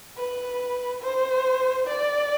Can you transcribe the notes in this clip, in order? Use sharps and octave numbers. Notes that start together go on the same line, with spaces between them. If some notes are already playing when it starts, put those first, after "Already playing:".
B4
C5
D5